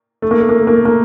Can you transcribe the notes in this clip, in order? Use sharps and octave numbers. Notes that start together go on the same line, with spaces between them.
A3
A#3
A3
A#3
A3
A#3
A3
A#3